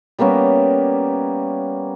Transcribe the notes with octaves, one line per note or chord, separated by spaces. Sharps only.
G3 A#3 B3 C#4